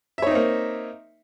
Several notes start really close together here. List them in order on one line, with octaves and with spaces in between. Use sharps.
E5 C#5 D#4 C4 A#3